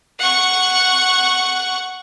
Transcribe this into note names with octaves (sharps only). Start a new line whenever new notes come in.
F#5 C#6